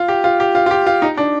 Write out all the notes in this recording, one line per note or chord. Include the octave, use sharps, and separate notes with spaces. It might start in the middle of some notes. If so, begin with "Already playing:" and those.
Already playing: F4
G4
F4
G4
F4
F4
G4
F4
D#4
D4